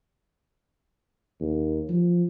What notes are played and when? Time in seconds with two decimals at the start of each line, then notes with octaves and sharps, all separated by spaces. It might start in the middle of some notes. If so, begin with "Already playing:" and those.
1.41 D#2
1.89 F3